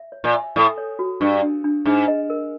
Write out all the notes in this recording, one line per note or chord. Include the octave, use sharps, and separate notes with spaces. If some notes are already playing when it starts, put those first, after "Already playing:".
Already playing: E5
C#5
A#2
E5
A2 A4
C#5
F#4
G2 D4
D4
D4
G#2 D4
D#5
A#4